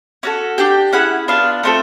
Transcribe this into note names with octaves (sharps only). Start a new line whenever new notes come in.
C#4 F#4 A4
D4 G4 G5
C#4 E4 G#4 F#5
B3 D4 F4 F5
A3 C4 F4 A4